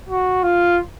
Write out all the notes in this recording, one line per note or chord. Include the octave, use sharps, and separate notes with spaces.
F#4
F4